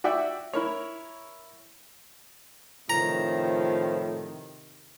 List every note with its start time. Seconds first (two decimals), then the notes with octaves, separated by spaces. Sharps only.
0.04 F#4 D5 E5 G5
0.53 E4 A#4 C#5
2.90 A2 C3 D#3 F3 A#5